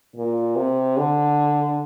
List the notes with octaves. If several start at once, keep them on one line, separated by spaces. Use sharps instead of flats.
A#2
C3
D3